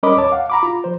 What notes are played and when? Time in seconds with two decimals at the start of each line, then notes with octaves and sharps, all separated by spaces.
0.03 G3 C#4 A#4 D#5 B5 D6
0.17 D#2 C#5 A5 D6
0.32 F5 F#5
0.50 A#5 B5 D6
0.63 F4
0.84 F3 C5